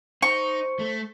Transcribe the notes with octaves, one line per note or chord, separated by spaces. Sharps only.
D#4 C5 C#6
A3